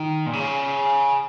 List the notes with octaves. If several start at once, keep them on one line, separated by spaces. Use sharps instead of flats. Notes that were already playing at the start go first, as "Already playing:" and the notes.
Already playing: D#3
A#2
C#3